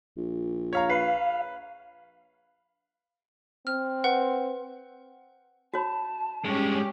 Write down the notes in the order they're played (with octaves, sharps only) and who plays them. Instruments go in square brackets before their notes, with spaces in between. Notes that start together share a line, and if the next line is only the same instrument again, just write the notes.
[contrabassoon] A#1
[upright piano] C#5 F5 A#5
[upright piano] B4 [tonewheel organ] F5
[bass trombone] C4 [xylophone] F6
[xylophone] B4 F#5
[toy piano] F#4 C#5 B5 [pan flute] A5
[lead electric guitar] G2 G#3 [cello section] C#4 G4